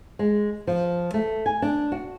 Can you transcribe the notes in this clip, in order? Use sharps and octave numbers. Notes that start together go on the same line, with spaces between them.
G#3
F3
A3
G#5
D4
F#4